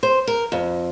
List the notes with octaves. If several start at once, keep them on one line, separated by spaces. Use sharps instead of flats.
C5
A#4
F2